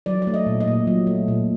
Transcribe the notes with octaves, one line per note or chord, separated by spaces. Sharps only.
F#3 D5
D5
A3
D#5
A#2
D#5
A#2
F#3
A3
A#2